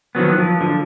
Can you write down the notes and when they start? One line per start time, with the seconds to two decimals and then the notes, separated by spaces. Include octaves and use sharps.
0.15 D#3 F3 F#3 B3
0.38 F3
0.61 D3 F3